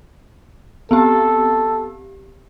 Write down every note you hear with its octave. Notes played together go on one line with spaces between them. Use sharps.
B3 C4 G4 A4